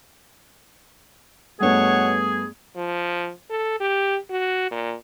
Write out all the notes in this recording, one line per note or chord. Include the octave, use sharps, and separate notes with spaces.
G2 B2 A3 B3 G#4 C#5 F#5
F3
A4
G4
F#4
A#2